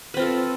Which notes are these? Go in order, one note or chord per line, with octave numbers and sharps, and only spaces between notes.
C4 F4 A4 B4